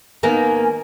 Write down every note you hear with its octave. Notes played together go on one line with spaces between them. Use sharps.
D#3 A#3 B3 G#5